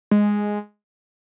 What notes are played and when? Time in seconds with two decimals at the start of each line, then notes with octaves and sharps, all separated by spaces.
0.11 G#3